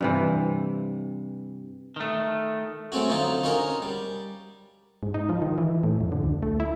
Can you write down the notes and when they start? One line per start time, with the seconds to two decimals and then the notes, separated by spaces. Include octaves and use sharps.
0.01 G2 C3 E3
1.96 D#3 A3
2.92 F#3 A3 C4 C#4 F#4
3.10 D3 F3 D#4 F4
3.43 C#4 D#4 F#4 A#4
3.82 G3
5.03 G#2
5.14 D#4
5.29 F3
5.42 D#3
5.58 E3
5.84 A2
6.01 F2
6.12 D3
6.23 D2
6.43 A3
6.60 E4